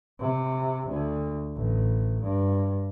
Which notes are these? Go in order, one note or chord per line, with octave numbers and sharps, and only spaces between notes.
C3
D2
A1
G2